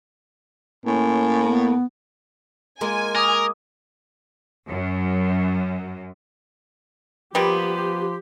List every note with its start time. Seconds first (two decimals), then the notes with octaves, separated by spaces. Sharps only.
0.86 A2 A#3 C#4
1.47 B3
2.81 G#3 A#3 F4 G#5
3.15 A#4 D6 D#6
4.68 F#2
7.35 F3 G3 A#3 B3 G4 C6